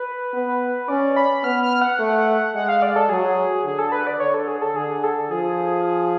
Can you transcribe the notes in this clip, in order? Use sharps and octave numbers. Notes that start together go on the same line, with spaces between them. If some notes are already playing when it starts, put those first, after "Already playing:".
Already playing: B4
B3
C#4 D5
B5
B3 F6
F6
F#5
A3
G#3 F#5
F5
D5
A4
F#3 G#4
D3 G#4
A4
B4
D5
D3 C#5
A4
G#4
A4
D3 G#4
A4
F3 G#4